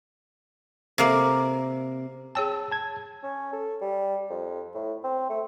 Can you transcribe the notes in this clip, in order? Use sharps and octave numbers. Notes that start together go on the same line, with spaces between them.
C3 A#3 D5
G#4 C#5 G5 A5 E6
A5 G#6
C#4
A4
G3
F2
A2
C4
A3